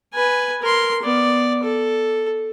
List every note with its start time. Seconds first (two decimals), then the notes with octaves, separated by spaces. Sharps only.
0.13 B4 G#5
0.62 A#4 C6
1.03 B3 D5
1.63 A4